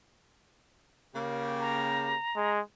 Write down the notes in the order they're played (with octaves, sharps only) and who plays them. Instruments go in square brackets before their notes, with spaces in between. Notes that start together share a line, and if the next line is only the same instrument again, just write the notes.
[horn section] C#3 A#3 G4
[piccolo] A#5
[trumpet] G#3